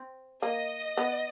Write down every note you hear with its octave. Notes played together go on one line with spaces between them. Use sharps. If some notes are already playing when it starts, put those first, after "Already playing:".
Already playing: C4
A#3 D#5
B3